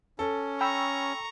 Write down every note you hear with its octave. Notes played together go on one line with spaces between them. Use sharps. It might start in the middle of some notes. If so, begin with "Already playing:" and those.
C#4 A4
G5 A#5 B5 C#6 E6